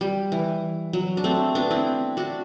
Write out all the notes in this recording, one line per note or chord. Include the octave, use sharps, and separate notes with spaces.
G3
E3
F#3
D4
A3 C4
B3 D4
C4 E4
D4 F#4